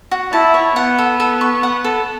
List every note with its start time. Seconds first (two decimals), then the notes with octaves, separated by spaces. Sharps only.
0.11 F#4
0.33 E4 A5
0.54 C#5
0.76 B3 F#5
0.99 A4
1.20 A4
1.41 C#6
1.63 F#5
1.85 A4